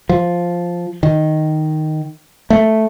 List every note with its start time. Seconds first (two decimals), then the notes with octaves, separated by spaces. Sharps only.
0.09 F3
1.03 D#3
2.50 A3